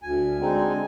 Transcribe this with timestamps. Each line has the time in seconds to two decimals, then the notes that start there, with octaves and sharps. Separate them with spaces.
0.03 D2 G#5
0.38 D3 G#3 C4 D#4